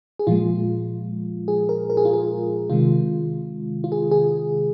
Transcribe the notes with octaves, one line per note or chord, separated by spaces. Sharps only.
G#4
A#2 F3 G#3 F4
G#4
A#4
A#4
G#4
F4
G#4
C3 D#3 G#3 F4
F4
G#4
G#4